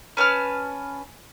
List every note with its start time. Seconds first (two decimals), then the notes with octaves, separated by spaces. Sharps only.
0.17 C#4 B4 A5 F6